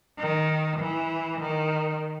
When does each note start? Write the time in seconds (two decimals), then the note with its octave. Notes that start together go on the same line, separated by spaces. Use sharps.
0.18 D#3
0.80 E3
1.40 D#3